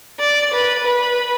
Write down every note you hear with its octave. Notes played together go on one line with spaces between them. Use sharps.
D5
B4
B4